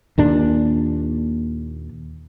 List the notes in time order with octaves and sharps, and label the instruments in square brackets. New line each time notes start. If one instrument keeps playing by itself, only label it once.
[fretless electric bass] D#2 A#2 D4